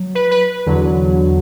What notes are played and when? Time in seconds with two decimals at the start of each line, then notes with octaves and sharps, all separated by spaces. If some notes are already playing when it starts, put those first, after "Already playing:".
Already playing: F#3
0.15 B4
0.31 B4
0.66 E2 D3 F#3